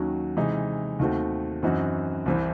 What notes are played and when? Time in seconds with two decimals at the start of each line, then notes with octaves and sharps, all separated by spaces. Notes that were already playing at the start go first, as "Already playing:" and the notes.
Already playing: D#2 D#3 F#3 C#4 F#4
0.37 C3 E3 G#3 D#4
0.99 D#2 D#3 A3 C4 F#4
1.63 F#2 E3 C4 D#4 F#4
2.26 C2 C3 E3 C4